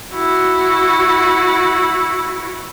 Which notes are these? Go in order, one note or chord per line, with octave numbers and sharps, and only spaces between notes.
E4 F#4